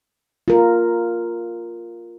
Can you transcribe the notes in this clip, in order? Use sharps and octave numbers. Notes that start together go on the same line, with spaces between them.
F4 A#4